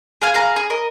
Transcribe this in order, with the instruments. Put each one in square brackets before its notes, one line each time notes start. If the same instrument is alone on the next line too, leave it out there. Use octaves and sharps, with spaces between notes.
[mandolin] G#4 F5 G#5
G#4 F5 A#5
G#4
A#4 D#5